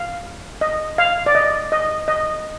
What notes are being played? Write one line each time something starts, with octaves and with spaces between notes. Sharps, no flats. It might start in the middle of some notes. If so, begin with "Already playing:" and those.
Already playing: F5
D#5
F5
D5
D#5
D#5
D#5